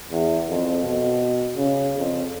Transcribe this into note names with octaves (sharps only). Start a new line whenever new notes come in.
E2
F2
B2
C#3
F2